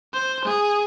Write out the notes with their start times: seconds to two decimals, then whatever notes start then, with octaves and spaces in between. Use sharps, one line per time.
0.13 C5
0.45 G#4